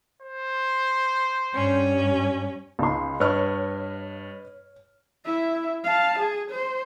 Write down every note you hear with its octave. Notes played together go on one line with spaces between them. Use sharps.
C5
G2 C#4
C#2 D#4 C6
G2 B4 C#5 D#5 C#6 F6
E4 E5
F5 A5
G#4
C5